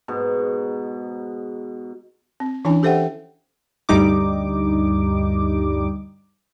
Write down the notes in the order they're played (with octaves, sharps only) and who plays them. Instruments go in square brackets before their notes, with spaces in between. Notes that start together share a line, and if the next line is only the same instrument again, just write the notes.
[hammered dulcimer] G#2 B2
[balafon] C4
E3 C#4 D4 E4 G#5
G4 A4 C5 E5 F#5 G5
[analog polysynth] D2 G2 G3 D#4 D6